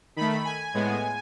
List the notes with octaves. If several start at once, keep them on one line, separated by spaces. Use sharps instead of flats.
D#3 A3 B5
G#5
A2 G#3 B3